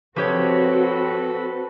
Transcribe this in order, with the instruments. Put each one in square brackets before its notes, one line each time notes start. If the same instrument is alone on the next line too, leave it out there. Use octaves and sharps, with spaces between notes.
[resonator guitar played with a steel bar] F3 G4 C#5 [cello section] C4 F#4 [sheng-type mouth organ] A4 B4